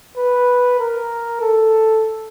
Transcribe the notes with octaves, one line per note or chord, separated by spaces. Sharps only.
B4
A#4
A4